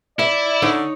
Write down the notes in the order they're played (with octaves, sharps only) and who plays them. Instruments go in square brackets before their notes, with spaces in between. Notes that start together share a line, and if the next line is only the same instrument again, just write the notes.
[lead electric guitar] E4 [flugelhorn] D5 [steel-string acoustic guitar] E5
[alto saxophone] D3 [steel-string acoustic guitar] D#4 C#5